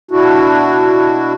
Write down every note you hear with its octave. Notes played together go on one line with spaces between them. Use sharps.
B2 D4 E4 F#4